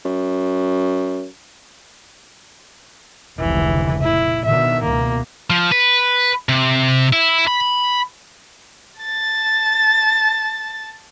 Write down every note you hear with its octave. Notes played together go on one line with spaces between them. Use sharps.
F#2
F1 C#2 D3 E3
A#2 E4
B2 D3 D#3 E5
C#2 B2 A#3
F3
B4
C3
E4
B5
A5 A6